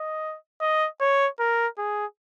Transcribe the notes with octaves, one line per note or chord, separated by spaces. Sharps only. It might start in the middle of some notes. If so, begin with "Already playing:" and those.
Already playing: D#5
D#5
C#5
A#4
G#4